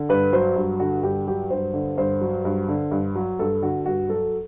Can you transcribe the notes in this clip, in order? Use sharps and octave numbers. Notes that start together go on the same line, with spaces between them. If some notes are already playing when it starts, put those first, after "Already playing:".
Already playing: D3
G2 B4
F#3 C5
G2
D3 F#4
G2 G4
F#3 G4
G2 C5
D3
G2 C5
F#3
G2
D3
G2
F#3
G2 A4
D3 F#4
G2 F#4
F#3 A4